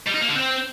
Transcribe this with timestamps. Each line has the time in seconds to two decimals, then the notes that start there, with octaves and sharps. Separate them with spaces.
0.07 G3
0.14 D#4
0.21 A#3
0.28 D3
0.35 C4